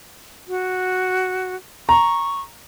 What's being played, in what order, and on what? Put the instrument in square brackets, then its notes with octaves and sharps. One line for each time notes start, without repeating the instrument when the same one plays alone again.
[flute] F#4
[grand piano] A#5 [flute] C#6